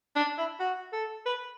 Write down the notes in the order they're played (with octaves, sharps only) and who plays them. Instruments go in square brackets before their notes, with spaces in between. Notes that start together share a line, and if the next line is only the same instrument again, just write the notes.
[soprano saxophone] D4
E4
F#4
A4
B4